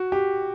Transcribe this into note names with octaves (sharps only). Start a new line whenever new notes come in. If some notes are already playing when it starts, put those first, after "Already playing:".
Already playing: F#4
G4